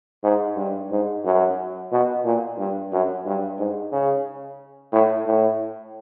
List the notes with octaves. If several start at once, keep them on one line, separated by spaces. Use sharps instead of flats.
G#2
G2
G#2
F#2
B2
A#2
G2
F#2
G2
G#2
C#3
A2
A2